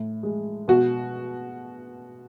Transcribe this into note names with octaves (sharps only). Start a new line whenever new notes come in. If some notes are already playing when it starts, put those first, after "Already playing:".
Already playing: A2
G#3
B2 F#4